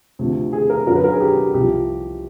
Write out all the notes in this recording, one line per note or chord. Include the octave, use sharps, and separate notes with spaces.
D2 C3 F3
G#4
A#4
F#2 D3 F#3 A#4
B4
A#4
G#4
G4
G4
C2 C3 F3 G4